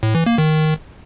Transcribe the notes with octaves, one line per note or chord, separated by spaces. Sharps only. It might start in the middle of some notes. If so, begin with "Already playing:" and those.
A2
E3
A#3
D#3